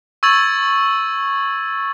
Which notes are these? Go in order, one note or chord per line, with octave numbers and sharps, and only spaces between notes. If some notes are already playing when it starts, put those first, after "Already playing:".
C#6 E6 G#6 A6 F#7